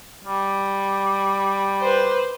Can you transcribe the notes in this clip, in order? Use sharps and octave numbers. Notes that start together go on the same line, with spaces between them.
G3
B4 C5